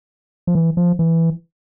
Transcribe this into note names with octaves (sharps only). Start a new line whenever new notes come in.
F3
E3
F3
E3